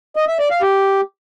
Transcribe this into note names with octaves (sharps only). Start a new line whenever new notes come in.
D#5
E5
D5
F5
G4